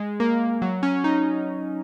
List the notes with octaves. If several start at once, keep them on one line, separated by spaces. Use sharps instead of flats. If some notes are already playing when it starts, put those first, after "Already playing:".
Already playing: G#3
A#3
F#3
C#4
D#4